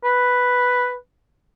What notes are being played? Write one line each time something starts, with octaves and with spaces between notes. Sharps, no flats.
B4